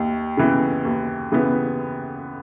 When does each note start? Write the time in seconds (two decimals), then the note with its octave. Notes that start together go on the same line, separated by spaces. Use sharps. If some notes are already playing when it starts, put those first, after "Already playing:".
Already playing: D#2
0.37 C#3 E3 B3
0.85 D#2
1.32 C#3 E3 B3